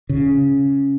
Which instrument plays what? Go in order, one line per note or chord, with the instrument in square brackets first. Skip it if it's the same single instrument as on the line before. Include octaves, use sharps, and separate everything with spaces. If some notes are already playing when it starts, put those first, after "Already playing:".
[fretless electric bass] C#3